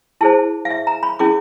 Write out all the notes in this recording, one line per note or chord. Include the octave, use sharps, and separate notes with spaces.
E4 G#4 C5 A5
F5
E5
A#5
B5
C#4 E4 G#4 D6